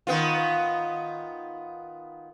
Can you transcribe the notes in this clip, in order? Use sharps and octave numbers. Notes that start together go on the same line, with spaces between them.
D#3 B3 F4